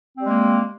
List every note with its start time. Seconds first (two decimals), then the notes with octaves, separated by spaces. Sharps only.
0.15 C4
0.20 G3
0.24 G#3
0.28 A#3